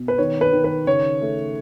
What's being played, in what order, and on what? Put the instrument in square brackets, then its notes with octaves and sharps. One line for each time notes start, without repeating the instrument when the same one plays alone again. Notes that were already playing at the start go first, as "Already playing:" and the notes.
Already playing: [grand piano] B2
B4
D#3 C#5
B4
D#3
B4
C#3 C#5
A3